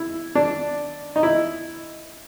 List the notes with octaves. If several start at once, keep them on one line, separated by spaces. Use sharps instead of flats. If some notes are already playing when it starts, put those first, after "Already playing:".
Already playing: E4
D4
D#4
E4